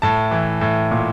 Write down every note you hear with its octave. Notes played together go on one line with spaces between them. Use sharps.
A2 A5
E3
A2
A#2